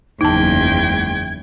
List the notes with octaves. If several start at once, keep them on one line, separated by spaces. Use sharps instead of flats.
F#1 E2 F3 G#3 D#4 G5 A5 G#6